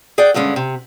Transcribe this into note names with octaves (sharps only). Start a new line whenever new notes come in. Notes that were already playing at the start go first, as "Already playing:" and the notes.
G#4 D5 F#5 G5
G2 D3 G#3 C#4
C3